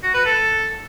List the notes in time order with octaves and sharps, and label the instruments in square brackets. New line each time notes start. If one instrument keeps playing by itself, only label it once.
[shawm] F#4
B4
A4